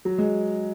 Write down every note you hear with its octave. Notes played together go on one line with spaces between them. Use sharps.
F#3
G#3